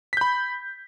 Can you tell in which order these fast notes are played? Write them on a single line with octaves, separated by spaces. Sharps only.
B6 G6 B5